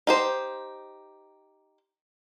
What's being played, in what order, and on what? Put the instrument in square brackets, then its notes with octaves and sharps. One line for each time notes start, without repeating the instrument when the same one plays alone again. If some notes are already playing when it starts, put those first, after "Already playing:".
[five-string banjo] D#4 G4 C5